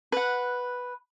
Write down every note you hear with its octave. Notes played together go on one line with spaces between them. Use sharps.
B4 F#5